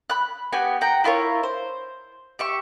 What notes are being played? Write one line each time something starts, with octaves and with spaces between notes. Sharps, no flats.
B5 F#6
B3 F#4 G4 G#5
F#5 G5 A#5
E4 F4 A#4 C#5
C5
G4 E5 C#6